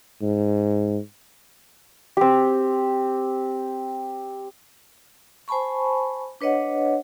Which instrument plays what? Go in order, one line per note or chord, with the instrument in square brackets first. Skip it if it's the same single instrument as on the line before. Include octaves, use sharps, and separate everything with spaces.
[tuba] G#2
[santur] C4 G4
[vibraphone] C5 G#5 A5 B5 C#6
D4 B4 C#5 D#5 F#5